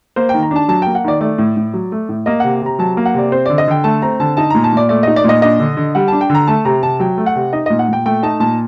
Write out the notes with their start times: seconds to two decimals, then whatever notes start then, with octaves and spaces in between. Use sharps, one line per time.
0.16 A#3 C5
0.29 D#3 G5
0.42 A#5
0.51 D4 A5
0.68 F#3 A5
0.82 A#3 G5
0.95 F#5
1.04 D#3 D5
1.21 A3 D5
1.38 A2
1.57 A2
1.74 F#3
1.92 A3
2.09 A2
2.26 A#3 D#5
2.40 C3 F#5
2.62 C3 A#5
2.79 F#3 A5
2.97 A#3
3.06 F#5
3.14 C3 D5
3.32 C4 C5
3.46 D3 D5
3.58 D#5
3.68 D3 G5
3.84 A3 A5
4.02 C4 A#5
4.20 D3 A5
4.37 D#4 A5
4.50 A#2 A#5
4.64 A5
4.73 A#2 D5
4.89 A3 D5
5.03 D#4 D#5
5.16 D5
5.24 A#2 D#5
5.42 D4 D#5
5.59 D3
5.77 D3
5.95 G3 F#5
6.08 D4 A5
6.21 G5
6.30 D3
6.35 A#5
6.47 A3 A5
6.65 C3 A#5
6.83 C3 A5
7.00 F#3 G5
7.18 A3
7.26 F#5
7.36 C3
7.53 D#4 D#5
7.66 A#2 D#5
7.79 F#5
7.88 A#2 G5
8.06 A3 G5
8.23 D#4 A5
8.40 A#2 A5